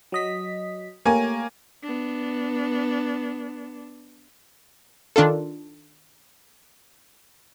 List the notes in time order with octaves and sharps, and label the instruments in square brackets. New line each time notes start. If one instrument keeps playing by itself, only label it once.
[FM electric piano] F#3 D#5 B6
[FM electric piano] A3 G4 C#5 [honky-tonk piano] A#3 G#5
[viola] B3 D4
[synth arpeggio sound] D#3 D4 F4 A4